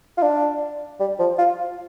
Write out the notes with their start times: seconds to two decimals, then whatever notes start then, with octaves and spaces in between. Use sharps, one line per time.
0.17 F4
0.23 D4
1.00 G3
1.19 F3
1.38 F4